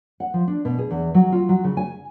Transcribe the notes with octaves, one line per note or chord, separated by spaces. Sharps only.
F#5
F3
D4
B2
G#4
E2
F#3
F4
F#3
C#3
G#5